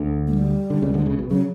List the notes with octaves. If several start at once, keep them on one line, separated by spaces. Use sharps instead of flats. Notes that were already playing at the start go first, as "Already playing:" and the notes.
Already playing: D2 D3
A3
G3
D3
C#2 C#3
D2 D3
C#2 C#3
B1 B2
C#3 F#3